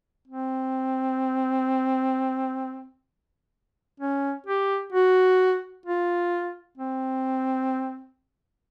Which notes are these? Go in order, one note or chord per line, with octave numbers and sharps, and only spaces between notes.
C4
C#4
G4
F#4
F4
C4